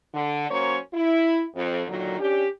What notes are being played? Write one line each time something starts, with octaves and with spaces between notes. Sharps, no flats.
D3
F#3 A#3 C#4 C5 C#5
E4
F2
A#2 D3 D#3 F#3
C#4 D4 G4